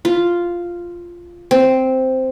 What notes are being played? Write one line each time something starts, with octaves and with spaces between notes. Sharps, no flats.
F4
C4